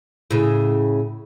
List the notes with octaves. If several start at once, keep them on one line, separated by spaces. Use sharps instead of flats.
A2 C#3